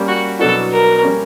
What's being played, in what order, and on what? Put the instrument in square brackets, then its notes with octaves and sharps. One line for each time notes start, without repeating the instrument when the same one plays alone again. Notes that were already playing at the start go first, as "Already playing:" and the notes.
Already playing: [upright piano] G3 A#3 C#4
[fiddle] F#4
[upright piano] B2 F#3 B3 D4 F#4 [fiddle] A4
[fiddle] A#4
[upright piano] G3 A#3 C#4